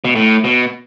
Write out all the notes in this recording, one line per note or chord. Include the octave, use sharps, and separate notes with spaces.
B2
A2
B2